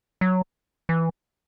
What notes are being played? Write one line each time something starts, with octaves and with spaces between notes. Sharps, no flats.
F#3
E3